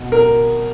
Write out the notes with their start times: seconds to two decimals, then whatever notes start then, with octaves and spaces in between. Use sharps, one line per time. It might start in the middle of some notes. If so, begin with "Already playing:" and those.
Already playing: B2
0.12 A#4